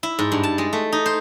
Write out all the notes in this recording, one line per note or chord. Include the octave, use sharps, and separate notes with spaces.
E4
G#2
G2
A5
G#3
A3
D#4
C5